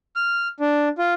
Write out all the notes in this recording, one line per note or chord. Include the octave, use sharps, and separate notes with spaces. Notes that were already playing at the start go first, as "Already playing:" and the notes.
F6
D4
F4